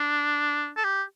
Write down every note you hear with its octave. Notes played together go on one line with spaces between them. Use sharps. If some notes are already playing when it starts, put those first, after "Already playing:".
Already playing: D4
A4
G4